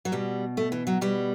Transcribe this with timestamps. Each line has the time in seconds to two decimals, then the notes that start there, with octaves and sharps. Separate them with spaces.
0.05 F#3
0.12 B2 G3
0.57 A3
0.72 E3
0.87 F#3
1.01 B2 G3